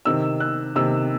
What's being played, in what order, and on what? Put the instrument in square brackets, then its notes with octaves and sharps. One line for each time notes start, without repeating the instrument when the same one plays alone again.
[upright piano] C3 D#3 E6
F#6
C3 D#3 E6